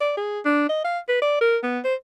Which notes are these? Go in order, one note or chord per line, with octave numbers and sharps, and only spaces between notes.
D5
G#4
D4
D#5
F5
B4
D5
A#4
B3
C5